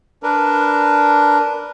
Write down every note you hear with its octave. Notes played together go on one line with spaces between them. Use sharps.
D4 A#4 B4